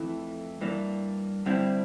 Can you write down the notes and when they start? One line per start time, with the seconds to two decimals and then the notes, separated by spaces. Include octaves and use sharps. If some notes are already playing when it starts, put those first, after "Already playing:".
Already playing: F2 E3 A3 E4
0.61 G2 E3 A#3 D4
1.46 G2 D3 G3 C4 E4